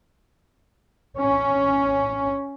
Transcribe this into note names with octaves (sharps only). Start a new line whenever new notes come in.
C#4